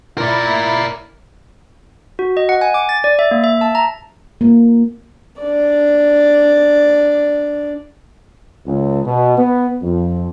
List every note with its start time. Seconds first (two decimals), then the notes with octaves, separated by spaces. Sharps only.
0.18 E4 A#4 D5
2.19 F#4
2.37 D#5
2.49 F#5
2.61 G#5
2.74 D6
2.89 A6
3.04 D5
3.19 E5
3.31 A#3
3.44 E5
3.61 A5
3.75 A#5
4.41 A#3
5.42 D4 D5
8.66 C#2
9.05 B2
9.37 B3
9.83 F2